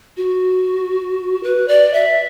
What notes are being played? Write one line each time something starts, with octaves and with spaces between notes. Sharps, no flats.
F#4
B4
D5
E5